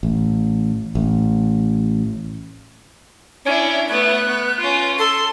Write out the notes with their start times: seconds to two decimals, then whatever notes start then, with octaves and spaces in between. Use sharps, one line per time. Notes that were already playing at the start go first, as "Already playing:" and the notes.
0.03 A1
0.95 A1
3.45 C#4 D4 E4
3.89 A3 B3 F#6
4.27 B3
4.59 C#4 F4
4.99 A4 C6